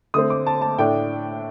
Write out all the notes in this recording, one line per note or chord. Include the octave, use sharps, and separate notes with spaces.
D3 A3 C4 D#6
D6
A5
A5
A2 A3 D4 G5